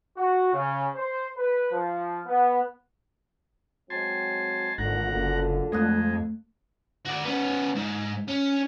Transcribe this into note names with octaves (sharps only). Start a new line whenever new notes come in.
F#4
C#3
C5
B4
F3
B3
F#3 G#3 C4 G#5 A5 C6
G#1 D2 A#2 D3 F#5 A#5
F#1
F2 G#3 A3 D#6 F#6
F#4 D5
B3 C#4
G#2
C#4